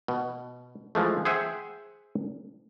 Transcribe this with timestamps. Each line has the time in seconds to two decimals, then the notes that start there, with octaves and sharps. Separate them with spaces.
0.08 B2
0.95 E3 F3 G#3 A3
1.25 G#4 C5 E5 F#5 G5